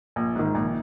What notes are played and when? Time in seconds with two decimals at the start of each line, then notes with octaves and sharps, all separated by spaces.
0.16 A#1
0.36 G#2 D#3
0.55 A#1